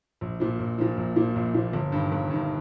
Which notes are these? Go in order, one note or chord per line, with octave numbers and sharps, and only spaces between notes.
A#1
A#2 F3
A#1
A#2 F3
A#1
A#2 F3
A#1
A#2 F3
G1
G2 D#3
G1
G2 D#3